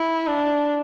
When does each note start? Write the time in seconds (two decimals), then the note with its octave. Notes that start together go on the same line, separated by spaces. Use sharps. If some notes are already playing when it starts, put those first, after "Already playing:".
Already playing: E4
0.27 D4